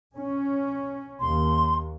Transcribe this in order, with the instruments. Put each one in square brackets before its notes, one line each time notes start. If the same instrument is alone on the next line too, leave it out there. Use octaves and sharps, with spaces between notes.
[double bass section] C#4
[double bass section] D#2 [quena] C6